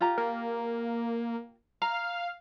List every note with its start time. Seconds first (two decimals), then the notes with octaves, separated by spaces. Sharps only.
0.01 F4 G4 A#5
0.17 A#3
1.82 F5 A#5